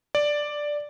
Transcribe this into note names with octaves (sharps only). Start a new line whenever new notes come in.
D5